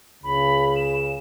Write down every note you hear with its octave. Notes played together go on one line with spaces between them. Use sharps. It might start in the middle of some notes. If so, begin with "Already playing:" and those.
C#2 C#3 B5
E7